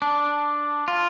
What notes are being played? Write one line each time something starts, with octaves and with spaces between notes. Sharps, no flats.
D4
F4